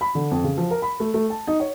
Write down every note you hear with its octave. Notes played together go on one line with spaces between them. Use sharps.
B5
D3
F2
C#3
F3
A#4
B5
A3
A3
A5
D#4
C#5